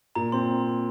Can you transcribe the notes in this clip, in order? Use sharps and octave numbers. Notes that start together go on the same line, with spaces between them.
A#2 A#5
C4 C6